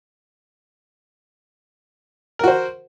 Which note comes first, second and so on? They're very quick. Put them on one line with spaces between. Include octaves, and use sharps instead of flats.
A#4 F#4 C5